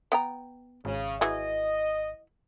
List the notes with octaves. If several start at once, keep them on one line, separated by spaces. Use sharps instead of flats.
B3 G5 A#5
G#1 C#3
E3 F#3 G#4 D#5